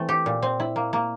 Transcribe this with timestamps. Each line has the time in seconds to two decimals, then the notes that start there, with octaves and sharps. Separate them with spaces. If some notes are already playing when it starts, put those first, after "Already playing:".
Already playing: E3 A3 C4
0.09 G4
0.26 A#2
0.42 C4
0.60 E4
0.76 A#3
0.93 A#3